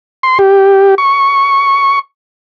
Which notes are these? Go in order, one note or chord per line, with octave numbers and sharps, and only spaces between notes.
C6
G4
C#6